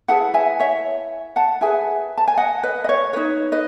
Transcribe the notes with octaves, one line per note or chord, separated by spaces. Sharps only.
E4 G#4 B4 F#5 A5
E5 G#5
C#5 E5
F#5 A5
E4 G#4 B4 E5 G#5
A5
G#5
D#5 F#5
B4 D#5
D#5
C#5
D#4 F#4 B4 C#5
B4 D#5